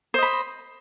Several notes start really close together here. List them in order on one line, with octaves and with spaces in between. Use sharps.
C5 D#5 B5